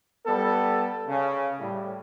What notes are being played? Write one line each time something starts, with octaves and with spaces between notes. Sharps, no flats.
G3 B3 A4
C#3
A2 G3